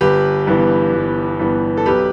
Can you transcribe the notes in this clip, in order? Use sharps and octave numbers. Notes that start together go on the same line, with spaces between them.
G1 G4 B4
G2 E3 B3
G1
G2 E3 B3
A4
B1 G4 B4